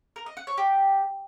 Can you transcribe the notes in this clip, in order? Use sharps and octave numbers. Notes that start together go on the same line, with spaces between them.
A#4
D#5
F#5
C#5
G4